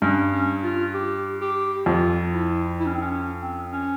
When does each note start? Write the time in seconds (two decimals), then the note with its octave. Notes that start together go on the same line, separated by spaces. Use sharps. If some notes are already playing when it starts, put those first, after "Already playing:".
0.02 G2 C#4
0.32 C#4
0.63 F4
0.94 G4
1.41 G4
1.86 F2 F4
2.33 E4
2.80 E4
2.86 C#4
2.94 C4
3.01 C#4
3.11 C#4
3.41 C4
3.72 C#4